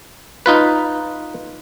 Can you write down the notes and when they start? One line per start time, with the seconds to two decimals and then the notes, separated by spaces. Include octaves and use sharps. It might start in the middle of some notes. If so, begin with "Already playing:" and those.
0.46 D#4 F4 B4